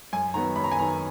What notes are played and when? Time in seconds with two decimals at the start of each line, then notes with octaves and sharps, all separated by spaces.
0.13 F#2 G#5
0.34 D#3 F#3 B3 A#5
0.56 F#2 B5
0.64 A#5
0.71 G#5
0.77 D#3 F#3 B3 A#5